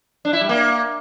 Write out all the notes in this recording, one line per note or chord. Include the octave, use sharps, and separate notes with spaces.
D4
E4
G3
A#3